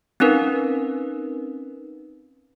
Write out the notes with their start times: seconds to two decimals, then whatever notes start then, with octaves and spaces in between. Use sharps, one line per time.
0.20 C4 C#4 D#4 A#4 B4